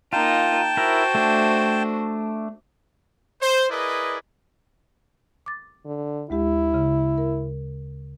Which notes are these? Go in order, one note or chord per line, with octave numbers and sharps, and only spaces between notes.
A#3 D#4 F4 G5 A5
E4 F#4 A#4 C5
A3 D4
C5
E4 G#4 A#4 B4 D5 D#5
D6 A6
D3
D2 G#3 E4 G4
C#3
A#4